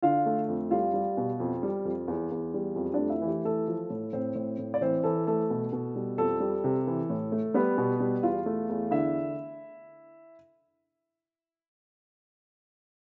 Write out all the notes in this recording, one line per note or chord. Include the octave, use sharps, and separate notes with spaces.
D3 F4 F5
A3
F2
G3 F4 F5
G3
B2
F2
G3
F2
E2
E2
G3
F2
A3 D4 D5
E4 E5
E3
G4
A3 A4
F3
A2
A2 C4 C5
A2
A2
D5
E3 C4 C5
E3 A4
A3 A4
B2
B2
G3
F2 A4
G3
C3
E3
A2
A3
G3 B3 B4
B2
G3
E2 F4 F5
A3
E2
D3 E4 E5